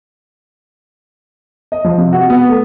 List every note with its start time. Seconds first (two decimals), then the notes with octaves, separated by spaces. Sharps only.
1.72 D#5
1.84 F3
1.98 C3
2.13 F#4
2.30 B3
2.49 A3